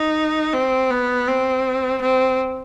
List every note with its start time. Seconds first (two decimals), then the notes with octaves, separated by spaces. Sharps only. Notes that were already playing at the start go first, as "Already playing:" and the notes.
Already playing: D#4
0.54 C4
0.90 B3
1.27 C4
2.01 C4